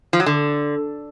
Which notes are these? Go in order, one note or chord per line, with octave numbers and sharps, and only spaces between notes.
F3
F#3
D3